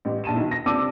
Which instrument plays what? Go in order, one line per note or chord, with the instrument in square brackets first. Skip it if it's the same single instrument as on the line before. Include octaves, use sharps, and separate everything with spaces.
[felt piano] A1 G3
A#1 A5 D#7 E7
B1 D#3 E4
A#6
C3 D4 A5 D6 E6 D#7